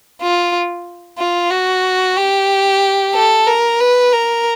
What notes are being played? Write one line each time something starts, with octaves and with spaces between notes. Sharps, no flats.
F4
F4
F#4
G4
A4
A#4
B4
A#4